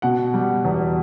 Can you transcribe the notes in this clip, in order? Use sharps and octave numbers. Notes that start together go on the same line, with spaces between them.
B2 F#5
G3
E2